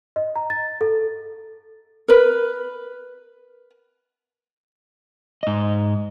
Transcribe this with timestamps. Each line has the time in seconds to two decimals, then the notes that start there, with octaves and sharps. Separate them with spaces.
0.16 D#5
0.36 A#5
0.50 A6
0.81 A4
2.08 A#4 B4
5.43 G#2 D#5